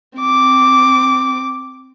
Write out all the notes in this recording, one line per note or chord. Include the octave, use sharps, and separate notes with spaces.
C4 D6